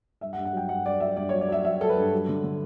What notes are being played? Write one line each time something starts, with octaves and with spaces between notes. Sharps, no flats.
G2 E5
F#5
G2
F#5
F#3 G5
G2 F#5
G2 D5
F#3 E5
G2 D5
F#3 C#5
D5
F#3 E5
F#3 E5
F#3 A4
B4
G2
F#3
D3
D3